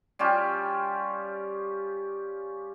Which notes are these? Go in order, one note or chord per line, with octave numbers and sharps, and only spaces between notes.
G3 C#4 F4 G4